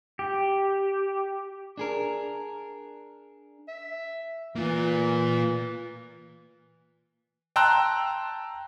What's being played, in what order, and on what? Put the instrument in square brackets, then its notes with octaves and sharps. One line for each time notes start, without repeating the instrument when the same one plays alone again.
[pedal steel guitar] G4
[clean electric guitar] D4 G#4 A#4
[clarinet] E5
[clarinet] E3 [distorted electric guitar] A#3 F4
[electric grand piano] G5 A5 A#5 C6 E6 F#6